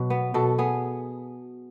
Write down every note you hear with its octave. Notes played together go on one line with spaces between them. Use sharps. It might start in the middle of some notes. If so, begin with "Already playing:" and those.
Already playing: B2 F#3
B3
B2 A4
B3 G#4